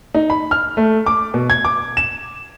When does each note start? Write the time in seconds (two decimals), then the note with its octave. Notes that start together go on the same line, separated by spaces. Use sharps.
0.15 D#4
0.30 B5
0.51 F6
0.77 A3
1.06 D6
1.34 B2
1.50 G#6
1.65 D6
1.97 E7